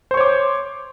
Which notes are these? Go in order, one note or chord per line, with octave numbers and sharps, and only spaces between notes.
C5 C#5 C#6 D6